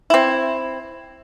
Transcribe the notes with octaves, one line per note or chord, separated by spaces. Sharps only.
C4 E4